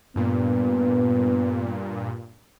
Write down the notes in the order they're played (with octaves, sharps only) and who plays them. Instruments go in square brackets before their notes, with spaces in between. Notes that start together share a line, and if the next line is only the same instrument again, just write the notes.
[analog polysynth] G2 A#2 [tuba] B3